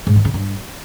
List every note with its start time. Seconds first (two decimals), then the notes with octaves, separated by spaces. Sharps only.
0.07 G#2
0.16 D#3
0.25 C#3
0.34 G2